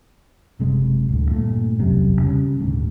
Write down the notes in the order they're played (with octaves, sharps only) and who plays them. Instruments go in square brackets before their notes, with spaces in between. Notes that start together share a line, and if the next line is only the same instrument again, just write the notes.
[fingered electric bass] F#1 C3 G#3
D1 D2
G2 A#2 F3 A3
E1 C2 F#2 C3
C#3 F#3 G3
D#1 D2 G#2